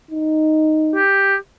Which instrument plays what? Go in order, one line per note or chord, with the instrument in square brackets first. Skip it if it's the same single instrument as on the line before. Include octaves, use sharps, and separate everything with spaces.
[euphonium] D#4
[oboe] G4